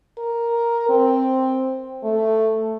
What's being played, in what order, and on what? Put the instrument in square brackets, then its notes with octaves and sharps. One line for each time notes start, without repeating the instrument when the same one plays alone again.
[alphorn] A#4
C4
A3